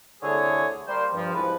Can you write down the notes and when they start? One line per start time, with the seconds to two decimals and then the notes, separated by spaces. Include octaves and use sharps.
0.23 C2 D3 A3 G#4 C#5
0.88 G3 A#3 C5
1.14 G2 F3
1.34 C2 G#2 F3 B4